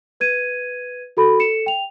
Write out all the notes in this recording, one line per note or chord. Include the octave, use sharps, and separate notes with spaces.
B4 G#6 D#7
F#4 A4 B5
A4 C#7 E7
G5 F7